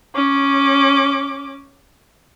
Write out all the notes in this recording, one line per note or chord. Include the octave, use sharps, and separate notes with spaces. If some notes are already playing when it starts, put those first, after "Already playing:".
C#4 D6